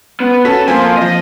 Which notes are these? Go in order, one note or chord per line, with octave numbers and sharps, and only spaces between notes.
B3
C#4 F#4 A4 B6
F3 A#3 C4 G#5
F3 D#5 B6